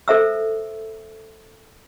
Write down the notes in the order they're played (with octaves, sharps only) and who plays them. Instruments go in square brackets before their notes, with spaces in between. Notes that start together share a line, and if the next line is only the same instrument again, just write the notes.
[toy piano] A4 C5 E5 A#5 E6